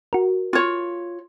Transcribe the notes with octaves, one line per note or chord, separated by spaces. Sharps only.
F#4 A#4
F4 C#5